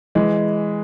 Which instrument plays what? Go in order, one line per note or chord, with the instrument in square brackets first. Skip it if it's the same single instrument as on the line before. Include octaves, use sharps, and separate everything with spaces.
[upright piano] E3 G#3